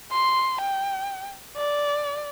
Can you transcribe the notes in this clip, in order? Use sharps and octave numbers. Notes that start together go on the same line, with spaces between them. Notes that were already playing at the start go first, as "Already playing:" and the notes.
C6
G5
D5